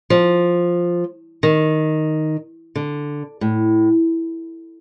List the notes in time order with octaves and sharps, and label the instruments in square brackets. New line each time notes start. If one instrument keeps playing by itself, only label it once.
[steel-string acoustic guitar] F3
D#3
D3
A2